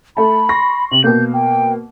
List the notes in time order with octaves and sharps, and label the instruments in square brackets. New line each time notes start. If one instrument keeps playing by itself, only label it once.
[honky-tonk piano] A3 A5 [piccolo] B5
[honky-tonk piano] C6 C#6 A#6
[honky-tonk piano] C3 [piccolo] F#7
[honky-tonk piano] B2 A#3 [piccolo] G6
[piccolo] G5